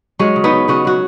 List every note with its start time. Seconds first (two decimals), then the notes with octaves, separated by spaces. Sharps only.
0.19 F#3 G#3 C#4
0.36 C#3
0.44 B3 D#4
0.52 C#3
0.68 C#3 C#4 F#4
0.85 F#3 F#4